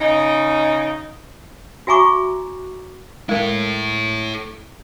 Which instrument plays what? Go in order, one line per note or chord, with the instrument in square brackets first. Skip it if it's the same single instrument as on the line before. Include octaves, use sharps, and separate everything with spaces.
[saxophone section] C#3 D#4
[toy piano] F#4 E5 G#5 A#5 C#6 D6
[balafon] G#3 A#4 [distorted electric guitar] E4 A4